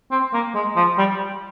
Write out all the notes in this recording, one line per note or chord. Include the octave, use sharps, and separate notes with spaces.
C4
A#3
G#3
F3
G3